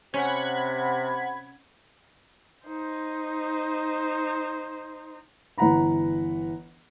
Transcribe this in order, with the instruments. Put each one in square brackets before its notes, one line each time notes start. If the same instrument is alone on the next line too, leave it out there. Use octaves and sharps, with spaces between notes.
[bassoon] C3 [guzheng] C#4 [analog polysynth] F#5 B5 G#6
[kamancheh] D#4 C5
[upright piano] G1 E3 F#5 A#5 B5